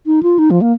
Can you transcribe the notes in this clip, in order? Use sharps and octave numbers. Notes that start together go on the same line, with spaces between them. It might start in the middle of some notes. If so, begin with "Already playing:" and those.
D#4
F4
D#4
F3
A#3